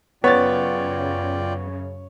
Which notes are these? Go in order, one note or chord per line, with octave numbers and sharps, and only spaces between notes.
F#2 C#3 B3 F4 C#5 D5 G5 A6